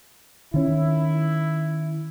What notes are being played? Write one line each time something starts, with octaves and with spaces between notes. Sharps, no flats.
D#3 C#4 E4